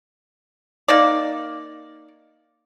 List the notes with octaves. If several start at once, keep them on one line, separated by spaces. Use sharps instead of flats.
A#3 D#4 D5